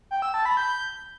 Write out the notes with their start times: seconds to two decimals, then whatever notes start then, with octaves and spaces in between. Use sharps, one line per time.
0.11 G5
0.22 E6
0.34 A5
0.45 B5
0.57 G6